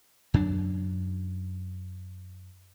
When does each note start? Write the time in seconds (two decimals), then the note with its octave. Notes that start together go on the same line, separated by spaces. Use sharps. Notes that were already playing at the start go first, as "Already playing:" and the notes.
0.34 F#2 F#3 D4